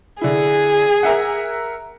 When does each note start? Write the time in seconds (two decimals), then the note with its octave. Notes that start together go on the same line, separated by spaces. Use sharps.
0.21 D3 E4 G#4
1.03 A#4 E5 F#5